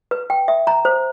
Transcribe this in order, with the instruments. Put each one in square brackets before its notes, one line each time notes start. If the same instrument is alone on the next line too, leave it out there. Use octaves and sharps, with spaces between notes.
[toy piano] B4
G5
E5
A#5
C5